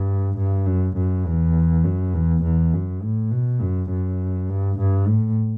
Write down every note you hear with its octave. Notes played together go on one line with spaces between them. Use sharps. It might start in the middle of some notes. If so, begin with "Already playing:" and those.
Already playing: G2
G2
F#2
F#2
E2
F#2
E2
E2
F#2
A2
B2
F#2
F#2
G2
G2
A2